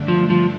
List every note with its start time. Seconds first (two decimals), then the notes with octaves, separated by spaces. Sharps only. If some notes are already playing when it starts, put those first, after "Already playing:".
Already playing: G2 D3 A3 D4
0.08 F3
0.30 F3